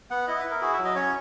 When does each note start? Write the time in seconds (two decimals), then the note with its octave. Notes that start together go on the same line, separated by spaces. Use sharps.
0.10 B3 F#5
0.27 E4 D#5
0.39 B4
0.45 E4
0.51 A#4
0.62 F#4 G#4
0.73 E5
0.78 F#3
0.85 D#5
0.95 C#4 C#5